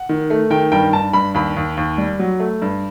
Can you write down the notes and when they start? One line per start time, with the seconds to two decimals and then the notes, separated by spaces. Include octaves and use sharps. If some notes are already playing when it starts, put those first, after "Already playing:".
Already playing: F#5
0.09 D#3
0.30 A3
0.50 D#3 G5
0.72 G2 G5
0.93 G2 A5
1.13 G2 B5
1.35 D#2 B5
1.57 D#2
1.77 D#2
1.98 G3
2.19 F#3
2.40 A3
2.62 G2